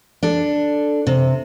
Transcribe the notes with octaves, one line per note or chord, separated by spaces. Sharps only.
D4 A4
C3